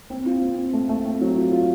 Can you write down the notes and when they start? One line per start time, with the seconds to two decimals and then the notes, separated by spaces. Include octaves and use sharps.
0.10 C4
0.26 F4
0.42 C4
0.58 C4
0.73 A3
0.89 A3
1.05 C4
1.21 F#3
1.36 F4
1.52 F4